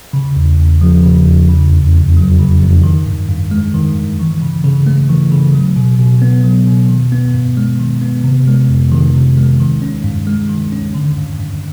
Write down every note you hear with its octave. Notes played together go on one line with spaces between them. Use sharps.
C#3
E2
E2
F3
C#3
E2
C#3
F2
F2
F#3
C#3
F2
D#3
G2
G2
G#3
D#3
G2
E3
C#3
C#3
A3
E3
C#3
F#3
B2
B2
B3
F#3
B2
D#3
B3
G2
G#3
D#3
B3
C3
G#3
F2
D#3
C3
G#3
D#3
C#4
G2
G#3
D#3
C#4
D3
G2
G2